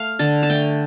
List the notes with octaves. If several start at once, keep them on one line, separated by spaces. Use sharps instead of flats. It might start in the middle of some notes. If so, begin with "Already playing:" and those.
Already playing: A3 F5
D3 A5
A5
A3 G5